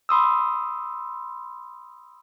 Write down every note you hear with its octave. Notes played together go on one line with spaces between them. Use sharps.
B5 C6 D#6 E6